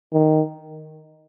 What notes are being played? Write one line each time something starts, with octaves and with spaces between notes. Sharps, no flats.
D#3